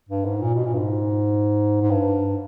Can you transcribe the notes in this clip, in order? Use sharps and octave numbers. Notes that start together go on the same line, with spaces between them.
G2
G#2
A#2
B2
A#2
G2
G#2
G#2
G2